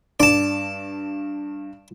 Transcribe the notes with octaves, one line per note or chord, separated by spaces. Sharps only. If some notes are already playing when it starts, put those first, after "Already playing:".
G2 D5 A5